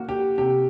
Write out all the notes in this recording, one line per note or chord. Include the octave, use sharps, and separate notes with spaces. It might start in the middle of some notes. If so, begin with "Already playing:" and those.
Already playing: A#3 F#4
G4
C3 G4